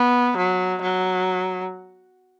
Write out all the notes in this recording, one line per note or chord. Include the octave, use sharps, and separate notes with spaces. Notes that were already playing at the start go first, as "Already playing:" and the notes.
Already playing: B3
F#3
F#3